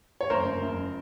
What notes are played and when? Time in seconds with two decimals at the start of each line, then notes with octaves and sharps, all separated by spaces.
0.21 C#5
0.30 F#1 A#4 C5
0.46 F#1
0.63 F#1